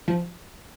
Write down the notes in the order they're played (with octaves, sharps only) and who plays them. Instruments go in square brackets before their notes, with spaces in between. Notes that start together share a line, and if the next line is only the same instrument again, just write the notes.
[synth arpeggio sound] F3